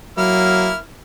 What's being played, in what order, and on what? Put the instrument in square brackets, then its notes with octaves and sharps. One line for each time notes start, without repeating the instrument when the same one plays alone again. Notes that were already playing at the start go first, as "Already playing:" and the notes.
[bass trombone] F#3 [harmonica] A#3 E4 F6